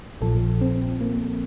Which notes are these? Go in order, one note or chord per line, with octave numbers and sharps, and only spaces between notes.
A#1 A#2 F3 A4
C4
A#3